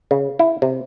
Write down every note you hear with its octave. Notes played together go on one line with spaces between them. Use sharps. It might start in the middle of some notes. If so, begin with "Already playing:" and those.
C#3
E4
C3